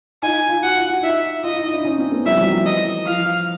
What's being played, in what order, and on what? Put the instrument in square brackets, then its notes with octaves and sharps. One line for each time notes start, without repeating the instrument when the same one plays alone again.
[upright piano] D#4 F4 [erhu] G#5
[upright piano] F4
[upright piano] F#4 [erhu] F#5
[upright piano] F4
F#4
[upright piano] D#4 F4 [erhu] E5
[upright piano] F4 [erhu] D#5
[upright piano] E4
D#4
D4 E4
C#4 D#4
C4 D4
A3 B3
[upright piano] F3 G3 [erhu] E5
[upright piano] E3 F#3
F3
[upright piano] E3 [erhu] D#5
[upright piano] F3 [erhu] F5